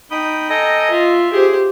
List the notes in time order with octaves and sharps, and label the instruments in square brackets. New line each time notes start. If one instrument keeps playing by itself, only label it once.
[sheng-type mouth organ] D#4 B5 D#6 [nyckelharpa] G5
[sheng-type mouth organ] A4 G#5 A#5 [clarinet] D#5
[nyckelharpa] F4 [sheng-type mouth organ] E5
[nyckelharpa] G4 C5 [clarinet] G#4